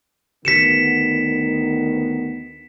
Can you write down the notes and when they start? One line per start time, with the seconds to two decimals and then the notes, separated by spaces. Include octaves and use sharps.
0.45 D2 D#3 B3 B6 C#7 E7